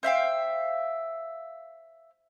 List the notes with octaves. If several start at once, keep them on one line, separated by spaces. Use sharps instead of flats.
C5 E5 F5 G5